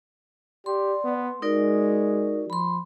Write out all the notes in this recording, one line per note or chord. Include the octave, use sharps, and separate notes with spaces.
G4 D5 C6
B3
G#3 D#4 F#4 A#4 D5
F3 B5 C6